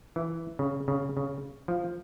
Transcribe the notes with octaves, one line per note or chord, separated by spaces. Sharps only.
E3
C#3
C#3
C#3
F3